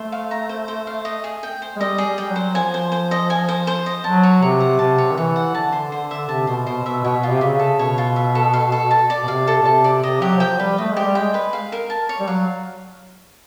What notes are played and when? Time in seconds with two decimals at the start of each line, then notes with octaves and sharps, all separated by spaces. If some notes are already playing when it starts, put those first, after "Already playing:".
Already playing: A3 C5
0.12 F5
0.31 A#5
0.49 C5
0.68 C5
0.87 F5
1.05 D#5
1.24 G#4
1.43 G5
1.62 C5
1.76 G#3
1.80 G3 D#5
1.98 G#4
2.06 G3
2.18 G3 G5
2.30 F#3
2.36 C5
2.55 F3 G#5
2.74 C5
2.92 C5
3.11 D#5
3.30 G#5
3.48 C5
3.67 C5
3.86 D#5
4.04 F#3 A5
4.23 C#5
4.42 C3 C#5
4.60 F#5
4.79 C3 A5
4.98 C#5
5.12 D#3
5.16 E3 C#5
5.36 F#5
5.55 D3 A5
5.72 C5
5.91 D3 C5
6.11 E5
6.29 C3 A5
6.47 B2 C5
6.66 B2 C5
6.85 B2 E5
7.04 B2 C#5
7.17 B2
7.23 F4
7.29 C3
7.41 C#3 E5
7.59 A4
7.78 B2 C#5
7.98 F4
8.16 E5
8.35 A4
8.53 F5
8.72 A4
8.91 A5
9.10 D5
9.23 B2
9.28 C3 F5
9.47 A4
9.61 B2
9.65 C3 A5
9.84 D5
10.03 C3 D#5
10.22 F#3 G4
10.40 F3 G5
10.59 G3 B4
10.78 A3 D#5
10.91 G#3
10.97 G4
11.04 G3
11.15 G#3 G5
11.34 B4
11.53 F5
11.72 A#4
11.90 A5
12.09 C#5
12.20 G3
12.27 F#3 F5